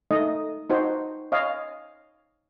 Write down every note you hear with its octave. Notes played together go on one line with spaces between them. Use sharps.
A3 D#4 D#5
D#4 F#4 C5
C#5 D#5 F5